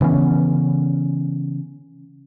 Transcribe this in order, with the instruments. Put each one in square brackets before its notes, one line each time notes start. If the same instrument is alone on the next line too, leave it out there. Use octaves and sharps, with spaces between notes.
[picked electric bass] C#3 E3 B3 C#4